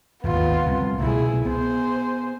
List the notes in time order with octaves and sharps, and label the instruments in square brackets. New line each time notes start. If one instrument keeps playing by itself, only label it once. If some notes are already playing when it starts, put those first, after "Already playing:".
[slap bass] D#1 G#1 D#2 [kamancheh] B3 F4
[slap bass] C2 F2 C3
[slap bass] C2 B2 A3 [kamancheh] E4 G#4
[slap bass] B3 [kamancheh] G#4 C5